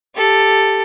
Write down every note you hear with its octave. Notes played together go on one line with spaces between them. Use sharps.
G4 A4